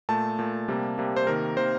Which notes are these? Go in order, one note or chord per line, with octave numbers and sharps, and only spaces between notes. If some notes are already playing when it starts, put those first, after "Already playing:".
A#2 A3 A5
A#2 A3
C3 G3 A#3
C3 G3 A#3
C5
C3 D#3 A#3 A#4
C3 D#3 A#3 C5